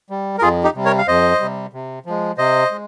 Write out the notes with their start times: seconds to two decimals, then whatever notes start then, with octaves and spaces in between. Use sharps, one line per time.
0.10 G3
0.38 A#4
0.42 F2 F4 G#4
0.64 D#4 G4
0.75 C3 G3
0.85 A#4 C#5
0.98 F5
1.07 F2 C5 D#5
1.40 C3 G3
1.73 C3
2.06 F3 G#3
2.38 C3 C5 D#5
2.71 G#3